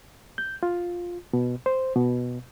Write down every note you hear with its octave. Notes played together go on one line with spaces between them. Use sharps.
G6
F4
B2
C5
B2